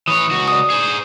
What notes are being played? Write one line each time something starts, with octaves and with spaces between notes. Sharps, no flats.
E3 C#5 D#6
C#2 F#4
D5 D#6
G#4 C5